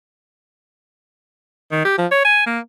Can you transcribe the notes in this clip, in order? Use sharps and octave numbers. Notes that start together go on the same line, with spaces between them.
D#3
G4
F3
C#5
G#5
A#3